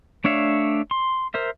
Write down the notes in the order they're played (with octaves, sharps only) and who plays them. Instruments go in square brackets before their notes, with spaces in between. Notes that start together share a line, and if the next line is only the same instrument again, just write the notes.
[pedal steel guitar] A3 D4 C#5 E5 F5
C6
A#4 C5 E5